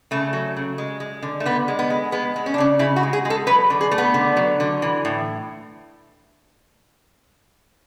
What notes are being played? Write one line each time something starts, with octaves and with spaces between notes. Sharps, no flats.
C#3 A3
F#3
C#3
G#3
G#3
D3
A3
D3 B3
G#3
B3
G#3
G#3 B3
G#3
C#4
D4
C#3 C#4
C#3 E4
F#4
G#3
G#4
G#3
A4
F#3 B4
D3
G#4
A3
B3
D3
F#3
D3
E3
A2